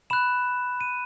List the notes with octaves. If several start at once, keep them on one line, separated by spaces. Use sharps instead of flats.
B5 F#6 E7
D#7